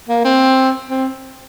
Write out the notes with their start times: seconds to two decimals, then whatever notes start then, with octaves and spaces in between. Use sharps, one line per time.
0.09 A#3
0.25 C4
0.89 C4